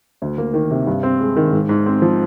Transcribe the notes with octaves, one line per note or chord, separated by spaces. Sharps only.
D2
A#3
D#3
C3
G2
C4
G#3
D#3
G#2
G#2
C4
F3